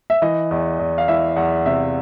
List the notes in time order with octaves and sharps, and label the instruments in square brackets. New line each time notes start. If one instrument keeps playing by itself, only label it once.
[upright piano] E5
E3 D#5
E2
E2
F5
E3 E5
E2 F#5
C3 E5